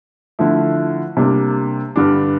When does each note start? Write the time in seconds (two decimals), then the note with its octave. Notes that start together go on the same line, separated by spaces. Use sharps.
0.39 D3 F3 A3 E4
1.17 C3 G3 A#3 D4
1.96 G2 D3 G3 D4